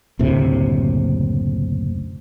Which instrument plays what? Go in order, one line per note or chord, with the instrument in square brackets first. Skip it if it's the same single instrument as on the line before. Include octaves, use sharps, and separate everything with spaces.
[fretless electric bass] F#1 D2 A2 C3